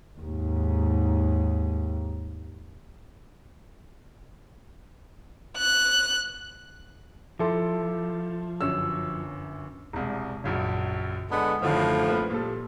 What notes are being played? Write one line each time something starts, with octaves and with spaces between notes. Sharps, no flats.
D#2 G#2
F#6
F3 E4 A4 C6 D6
G1 F#2 C#5 E6
E1 C2
A#1 F#2 C#3
D3 G#3 B3 B5
F#2 A2 D3 D#3 F3
A#3 C4 B4
A#2 G3 A4